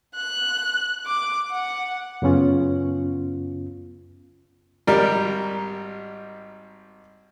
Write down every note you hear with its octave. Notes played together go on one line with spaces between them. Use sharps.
F#6
D6
F#5
F#2 C#3 B3 C#4 F4
G#1 G3 A#4